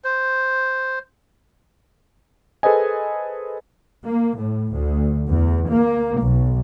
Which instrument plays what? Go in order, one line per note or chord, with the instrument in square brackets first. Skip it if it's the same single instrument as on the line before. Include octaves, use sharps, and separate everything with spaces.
[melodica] C5
[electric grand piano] G#4 A4 B4 C5 D#5 G#5
[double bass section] A#3
A2
D2
E2
A#3
B1